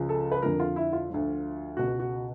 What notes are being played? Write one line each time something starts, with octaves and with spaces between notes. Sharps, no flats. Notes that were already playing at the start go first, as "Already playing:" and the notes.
Already playing: C#2 C#3 F3
A4
B4
F2 D3 F3 A#4
F4
E4
F4
D2 D3 F3
C#2 B2 F#4
F#4